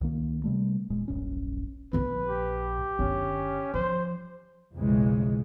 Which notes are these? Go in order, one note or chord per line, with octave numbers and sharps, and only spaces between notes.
C#2 D#3 A#3
C3 G3 A3
E1 A#2 G#3
D#1 A#1 F#2 C#4
A#1 A#2 B4
G4
F#1 D3 C#4
F3 C5
B1 F2 A2 C#3 E3 G#3